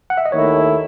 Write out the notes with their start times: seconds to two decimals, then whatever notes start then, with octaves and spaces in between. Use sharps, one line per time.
0.10 F#5
0.17 E5
0.26 D#5
0.32 D#2 D#3 A3 E4 C#5